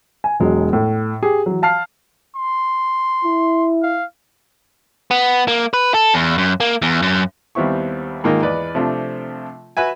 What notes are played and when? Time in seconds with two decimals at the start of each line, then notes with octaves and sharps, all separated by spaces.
0.24 G#5
0.40 E1 B2 F#3 G#3
0.73 A2
1.22 G4 G#4
1.46 E3 F#3
1.62 F5 A5 F6 C7
2.36 C6
3.24 E4
3.83 F5
5.11 B3
5.48 A#3
5.73 B4
5.94 A4
6.14 E2
6.38 F#2
6.60 A#3
6.82 E2
7.02 F#2
7.55 D#2 G3 B3 C4 E4 C#6
8.24 G#2 D#3 A#3 D#4 F4
8.42 E2 B4 D5 D#5
8.75 C3 F3 A3 C4 D4 F4
9.77 F#4 B4 E5 G#5